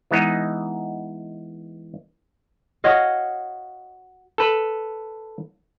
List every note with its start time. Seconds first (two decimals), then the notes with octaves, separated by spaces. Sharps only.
0.11 E3 G#3 B3 D#4
2.84 F#4 C#5 D#5 F5
4.38 A4 B4